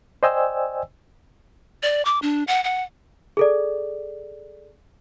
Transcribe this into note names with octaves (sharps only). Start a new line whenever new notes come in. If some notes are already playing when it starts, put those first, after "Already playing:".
C5 D5 D#5 G5 G#5 E6
D5
D6
D4
F#5
F#5
G#4 A4 D5